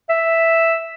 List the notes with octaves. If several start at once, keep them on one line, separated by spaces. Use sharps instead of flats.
E5